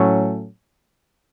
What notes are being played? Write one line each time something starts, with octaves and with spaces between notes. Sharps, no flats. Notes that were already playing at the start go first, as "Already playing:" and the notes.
Already playing: A2 F#3 A3 C#4